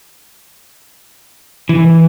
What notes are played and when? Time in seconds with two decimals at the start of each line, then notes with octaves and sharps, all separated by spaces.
1.69 E3